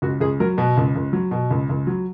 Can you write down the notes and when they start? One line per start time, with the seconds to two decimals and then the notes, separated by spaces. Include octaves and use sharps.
0.02 C#2 F#4
0.20 C#2 G#4
0.40 F#3 A#4
0.57 B2 B4
0.77 C#2
0.96 C#2
1.13 F#3
1.31 B2
1.51 C#2
1.69 C#2
1.87 F#3